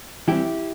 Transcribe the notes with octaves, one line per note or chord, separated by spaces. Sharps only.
E3 G3 C4 E4 G4